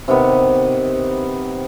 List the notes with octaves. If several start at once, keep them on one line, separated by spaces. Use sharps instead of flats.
C3 D#3 B3